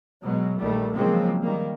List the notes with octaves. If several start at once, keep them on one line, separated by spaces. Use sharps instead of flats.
B2 F#3 G#3
A#1 D#3 G3 A3
C#3 F3 F#3 G#3 A#3 C4
D#3 G3 A#3